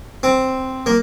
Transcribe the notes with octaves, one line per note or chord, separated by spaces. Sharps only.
C4
A#3